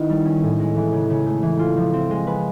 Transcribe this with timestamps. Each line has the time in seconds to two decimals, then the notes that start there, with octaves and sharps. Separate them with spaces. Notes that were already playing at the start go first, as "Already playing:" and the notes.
Already playing: D#3 B3 E4
0.09 G3
0.25 C#4
0.43 A2
0.60 G#3
0.76 E3
0.92 C#3
1.10 C#3
1.27 A3
1.43 E3
1.59 F4
1.77 F3
1.93 C4
2.11 G#3
2.27 B4